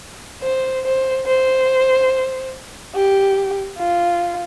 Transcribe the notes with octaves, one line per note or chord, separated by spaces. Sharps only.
C5
C5
C5
G4
F4